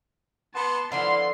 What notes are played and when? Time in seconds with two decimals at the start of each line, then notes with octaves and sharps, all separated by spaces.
0.55 B3 A5 C6
0.92 D3 F3 B3 E4 D5 F5 C6